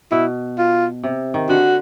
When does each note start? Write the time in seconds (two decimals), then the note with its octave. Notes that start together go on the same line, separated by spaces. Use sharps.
0.12 B2 E4
0.58 F4
1.04 C3
1.34 D#3
1.49 D3 F#4